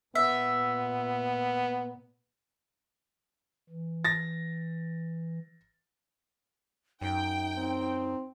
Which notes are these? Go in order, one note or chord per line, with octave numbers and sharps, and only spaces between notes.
A#2 B3 E5
E3
A6 A#6
F#2 D#4 G5
C4